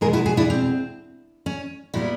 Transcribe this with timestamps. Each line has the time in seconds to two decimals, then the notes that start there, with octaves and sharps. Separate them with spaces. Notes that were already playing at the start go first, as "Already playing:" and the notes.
0.01 E2 B2 G#3 G#4 A#4
0.13 E4 F#4
0.26 F#4 G#4
0.37 D4 E4
0.50 C4
1.46 C#4
1.94 A#2 G3 B3 E4 F#4